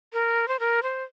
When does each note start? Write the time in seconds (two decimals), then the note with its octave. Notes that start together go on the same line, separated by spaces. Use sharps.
0.13 A#4
0.48 C5
0.60 A#4
0.83 C5